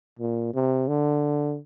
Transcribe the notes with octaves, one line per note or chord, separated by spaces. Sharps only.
A#2
C3
D3